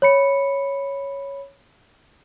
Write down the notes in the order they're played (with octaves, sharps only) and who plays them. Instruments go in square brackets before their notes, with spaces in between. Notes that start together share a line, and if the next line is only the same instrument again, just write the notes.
[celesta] C#5 B5 C#7